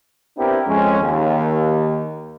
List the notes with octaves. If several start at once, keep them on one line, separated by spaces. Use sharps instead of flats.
B3 C4 D4 E4 G4 A#4
F2 G#3 C#4
D#2